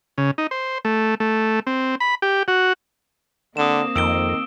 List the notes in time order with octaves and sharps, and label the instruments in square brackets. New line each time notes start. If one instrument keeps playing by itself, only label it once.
[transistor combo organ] C#3
D#4
C5
A3
A3
C4
B5
G4
F#4
[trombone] D3 [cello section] A#3 C4 [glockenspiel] D#6 E7
[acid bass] F2 [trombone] D#3 [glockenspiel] E6 D7 G7